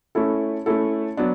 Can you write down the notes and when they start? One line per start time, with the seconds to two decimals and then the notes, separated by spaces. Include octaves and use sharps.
0.15 A3 C#4 E4 A4
0.66 A3 C#4 E4 A4
1.17 F#3 B3 D4